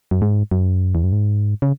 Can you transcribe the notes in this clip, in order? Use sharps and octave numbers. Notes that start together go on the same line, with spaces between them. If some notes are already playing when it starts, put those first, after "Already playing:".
F#2
G#2
F#2
E2
F#2
G#2
C#3